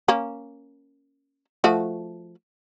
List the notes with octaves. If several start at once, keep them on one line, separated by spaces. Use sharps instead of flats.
A#3 C#4
F3 A3 F#4